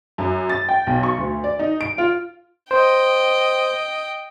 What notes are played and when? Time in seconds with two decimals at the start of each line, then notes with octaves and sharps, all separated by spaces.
0.18 F#2
0.49 A6
0.69 G5
0.87 B1
1.03 C#6
1.18 D2
1.44 D5
1.59 D#4
1.81 D7
1.98 F4
2.71 C5 D#5 G5